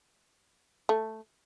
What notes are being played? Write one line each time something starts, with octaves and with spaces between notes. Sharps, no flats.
A3